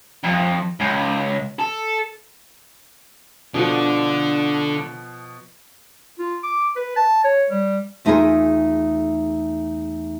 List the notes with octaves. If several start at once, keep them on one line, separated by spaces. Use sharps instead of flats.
F2
C#2
A4
B2 D3 F3
F4
D6
B4
A5
C#5
G3
E2 A3 D#4 F4 G#4 A#4